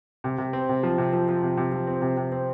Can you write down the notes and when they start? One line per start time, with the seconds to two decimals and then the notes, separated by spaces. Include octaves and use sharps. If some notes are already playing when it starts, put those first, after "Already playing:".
0.24 C3
0.38 C3
0.53 C4
0.69 C3
0.83 F3
0.98 C3
1.13 F3
1.29 F3
1.43 C3
1.57 C3
1.72 F3
1.87 C4
2.02 C3
2.17 C3
2.32 C4